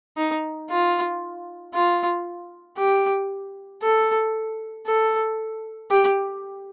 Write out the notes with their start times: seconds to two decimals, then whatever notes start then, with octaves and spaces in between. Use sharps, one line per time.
0.17 D#4
0.70 F4
1.74 F4
2.77 G4
3.82 A4
4.86 A4
5.91 G4